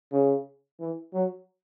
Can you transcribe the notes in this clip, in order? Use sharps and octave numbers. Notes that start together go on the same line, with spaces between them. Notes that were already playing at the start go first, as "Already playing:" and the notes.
C#3
E3
F#3